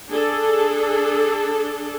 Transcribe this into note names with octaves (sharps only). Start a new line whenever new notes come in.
D4 G#4 A4